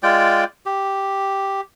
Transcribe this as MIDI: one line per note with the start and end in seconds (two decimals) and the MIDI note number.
0.03 0.44 56
0.03 0.44 65
0.03 0.44 74
0.03 0.44 79
0.66 1.61 67